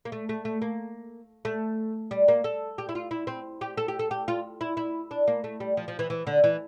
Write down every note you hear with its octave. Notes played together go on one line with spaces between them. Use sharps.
A#3
A3
A3
A3
A#3
A3
G3
A#3
A4
G4
E4
F4
E4
C4
G4
A4
G4
A4
G4
F4
E4
E4
D4
A#3
A3
G3
F3
F3
E3
E3
D3
E3